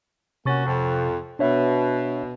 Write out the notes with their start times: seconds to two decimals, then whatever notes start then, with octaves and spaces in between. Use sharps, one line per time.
0.46 C3 A#3 C#4 F#4 C#6 A6
0.65 F2
1.39 B2 D4 C#5 E5